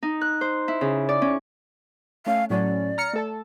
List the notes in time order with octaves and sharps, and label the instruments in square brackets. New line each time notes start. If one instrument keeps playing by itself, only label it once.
[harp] D#4
F#6
C5
E4
C#3
D5
C#4
[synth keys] A3 C#4 [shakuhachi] F5
[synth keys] A2 F#3 C#4 [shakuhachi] D5
[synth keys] A#5 F6 C#7
A3 A4 A5